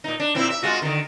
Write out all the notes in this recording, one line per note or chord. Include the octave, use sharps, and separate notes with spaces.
A#2 D#4
D4
A#2 C4 E4
E5
G#3 F4 F#4
D3 D#3